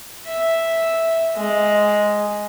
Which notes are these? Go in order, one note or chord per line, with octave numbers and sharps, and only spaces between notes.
E5
G#3